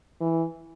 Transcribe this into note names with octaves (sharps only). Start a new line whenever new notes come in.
E3